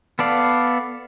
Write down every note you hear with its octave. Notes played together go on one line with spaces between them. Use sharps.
B3 A4 D5 F5